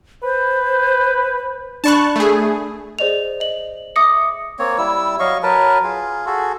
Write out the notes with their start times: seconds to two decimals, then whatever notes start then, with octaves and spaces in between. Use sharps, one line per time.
0.23 B4 C5
1.84 D4 D5 A5 B5 C#6 F#6
2.16 A3 G#4
2.99 G#4 C5 D5 D#5 F7
3.40 D#5 F#7
3.96 E5 D6 D#6 A#6 C#7
4.59 A#3 C4 C#5
4.78 G3 E4 E6
5.20 F#3 D#5 F5 C#6
5.43 F#3 A#4 B4 A5
5.83 F4 G#4
6.26 F#4 G#4 A4